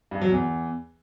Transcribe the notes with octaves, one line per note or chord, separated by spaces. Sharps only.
G2
F#3
E2